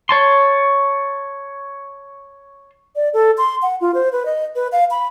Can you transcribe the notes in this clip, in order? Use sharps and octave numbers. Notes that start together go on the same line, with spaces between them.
C#5 A5 C6
D5
A4
C6
F#5
F4
C5
B4
D#5
B4
F5
B5